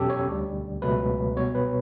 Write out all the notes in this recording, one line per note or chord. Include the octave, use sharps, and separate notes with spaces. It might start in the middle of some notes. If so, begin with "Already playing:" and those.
Already playing: E2 B2 F#3 C#4 G4 A4
C#5
D2 D3 G3
C#2 B2 F#3 A3 B4
B2 G3 B3 C#5
B4